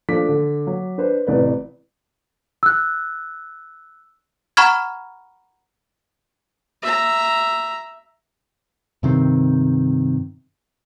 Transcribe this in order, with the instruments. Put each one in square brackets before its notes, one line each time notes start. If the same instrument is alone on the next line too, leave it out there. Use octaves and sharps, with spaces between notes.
[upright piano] F3 A3 D4 D6 B6
D3
F#3
D4 B4 C5
A1 C3 B4 D5
[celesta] E6 F#6
[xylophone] F#5 A#5 B5 C#6 F6 G#6
[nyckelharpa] E5 A#5
[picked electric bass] G2 C3 D#3 C4